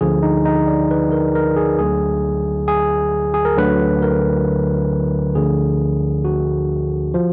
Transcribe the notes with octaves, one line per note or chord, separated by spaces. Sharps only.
D2 D3 F3 G#4
D#4
D#4
D5
B4
A#4
A#4
G#4
D2 D3 F#3 G#4
G#4
G#4
A#4
D2 D3 F#3 B4
A#4
D2 D3 F3 G#4
F#4
F3